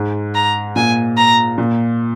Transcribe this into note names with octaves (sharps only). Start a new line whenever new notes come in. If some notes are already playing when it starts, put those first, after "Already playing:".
Already playing: G#2
A#5
A#2 G#5
A#5
A#2